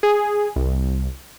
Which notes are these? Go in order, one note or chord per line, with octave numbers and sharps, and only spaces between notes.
G#4
C2